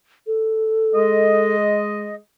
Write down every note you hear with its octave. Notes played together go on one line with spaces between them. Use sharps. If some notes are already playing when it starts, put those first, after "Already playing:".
A4
G#3 D#5